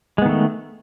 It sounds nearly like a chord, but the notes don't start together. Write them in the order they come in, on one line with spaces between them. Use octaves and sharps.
G#3 B3 D#3 A3